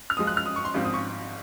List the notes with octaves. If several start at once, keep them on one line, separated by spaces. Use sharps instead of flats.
F6
F#2 F3 G#3 D#6
F#6
F6
D#6
C#6
C6
G#1 G#2 F3 C4
D#6
C#6